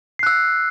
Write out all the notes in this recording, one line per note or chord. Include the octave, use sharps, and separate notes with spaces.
E6 F#6 C7